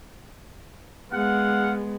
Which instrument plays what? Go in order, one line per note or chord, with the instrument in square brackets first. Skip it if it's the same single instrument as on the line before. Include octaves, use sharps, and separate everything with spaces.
[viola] G#3 B3 [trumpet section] F5 F#5